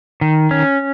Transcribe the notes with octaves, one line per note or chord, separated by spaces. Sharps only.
D#3
C#4